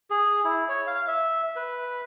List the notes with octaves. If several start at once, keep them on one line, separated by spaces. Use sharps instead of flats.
G#4
E4
C#5
F5
E5
B4